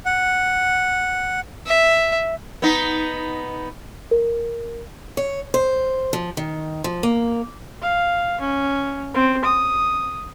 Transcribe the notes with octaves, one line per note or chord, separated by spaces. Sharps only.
F#5
E5
B3 D#4
A#4
C#5
C5
F3
D#3
F3
A#3
F5
C#4
C4
D#6